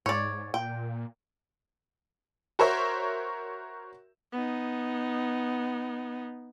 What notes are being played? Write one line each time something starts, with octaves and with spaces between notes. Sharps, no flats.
G#2 C#5 D5
A#2 G5
F#4 A#4 C5 C#5 E5
B3 D#4